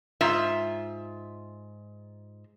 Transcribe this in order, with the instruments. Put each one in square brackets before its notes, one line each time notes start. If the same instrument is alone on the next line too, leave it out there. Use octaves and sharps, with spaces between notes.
[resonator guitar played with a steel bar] G#2 F4 E5